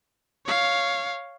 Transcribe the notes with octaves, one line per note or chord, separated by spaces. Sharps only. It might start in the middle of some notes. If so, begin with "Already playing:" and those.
C#5 F5